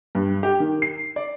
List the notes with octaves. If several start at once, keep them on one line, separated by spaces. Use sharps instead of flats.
G2
G4
D#3
C7
D5